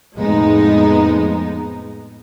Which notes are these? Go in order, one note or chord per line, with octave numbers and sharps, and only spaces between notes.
F2 A2 G#3 B3 D#4